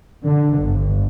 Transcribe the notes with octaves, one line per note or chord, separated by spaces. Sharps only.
D3
G1